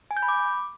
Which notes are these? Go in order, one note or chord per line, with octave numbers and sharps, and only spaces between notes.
G#5
G6
B5
D6